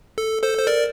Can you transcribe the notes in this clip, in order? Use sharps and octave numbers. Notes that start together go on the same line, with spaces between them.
A4
A4 C5
C5
A#4 D5